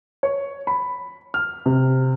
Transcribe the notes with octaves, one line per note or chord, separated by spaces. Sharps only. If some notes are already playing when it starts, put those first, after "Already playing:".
C#5
B5
F6
C3